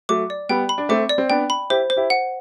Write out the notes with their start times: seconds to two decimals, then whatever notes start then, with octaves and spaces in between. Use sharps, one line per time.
0.09 F#3 A3 D6
0.30 D5
0.49 G3 B3 G5
0.69 B5
0.78 D4
0.89 A3 C4 D6
1.09 D5
1.18 C4
1.30 B3 D4 G5
1.50 B5
1.70 E4 G4 C5
1.90 C5
1.97 E4 G4
2.10 F#5